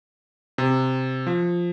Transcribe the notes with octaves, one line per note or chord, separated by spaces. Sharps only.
C3
F3